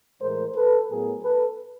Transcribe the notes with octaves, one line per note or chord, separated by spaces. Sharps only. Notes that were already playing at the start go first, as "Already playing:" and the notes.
A2 E3 G#3 A#4 C5
A4 B4
A2 F#3 B3 G#4 A#4
A4 B4